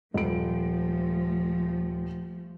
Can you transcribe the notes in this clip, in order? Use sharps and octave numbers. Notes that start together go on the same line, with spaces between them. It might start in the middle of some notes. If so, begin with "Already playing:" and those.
D#1 F3 A3 D7